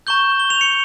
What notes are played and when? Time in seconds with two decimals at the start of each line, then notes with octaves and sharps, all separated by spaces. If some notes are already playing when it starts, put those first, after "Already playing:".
0.07 A#5 C#6 G6 G7
0.40 G7
0.50 F7
0.61 C#7